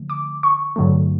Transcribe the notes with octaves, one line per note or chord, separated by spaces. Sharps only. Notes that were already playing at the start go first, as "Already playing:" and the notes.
Already playing: D3 F3 A3
D6
C#6
G2 D3 F#3 A3